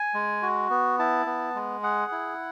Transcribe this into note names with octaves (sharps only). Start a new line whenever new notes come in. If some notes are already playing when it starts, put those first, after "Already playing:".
Already playing: G#5
G#3
F#4
B3
E4 A5
B3
G#3
G#4 F#5
E4